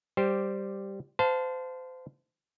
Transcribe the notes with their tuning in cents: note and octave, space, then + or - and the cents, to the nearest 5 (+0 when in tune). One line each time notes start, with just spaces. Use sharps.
G3 +0 G4 +0 C5 -5
C5 -30 F5 +10 A5 +0